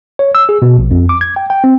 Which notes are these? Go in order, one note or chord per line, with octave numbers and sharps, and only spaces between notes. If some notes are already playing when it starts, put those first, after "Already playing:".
C#5
E6
G#4
B2
A#1
F2
D6
G#6
G5
G5
C4